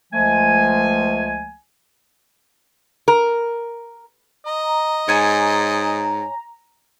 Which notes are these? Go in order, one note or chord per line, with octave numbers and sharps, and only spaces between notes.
C#2 F3 G#3 A3 G#5
A#4
D#5 A#5
G#2 C#5 G#5 A5